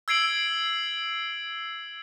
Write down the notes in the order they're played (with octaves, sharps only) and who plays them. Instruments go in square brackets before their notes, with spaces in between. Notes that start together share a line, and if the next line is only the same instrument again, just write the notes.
[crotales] E6 G#6 C7 D7 F#7